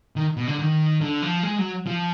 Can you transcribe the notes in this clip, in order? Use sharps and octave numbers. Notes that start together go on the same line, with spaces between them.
D#3
B2
D3
D#3
D3
F3
G#3
F#3
F3